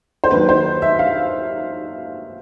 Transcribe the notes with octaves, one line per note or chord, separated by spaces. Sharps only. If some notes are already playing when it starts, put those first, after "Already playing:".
C5
D#2 D#3 F#3 B4
C5
E5
F5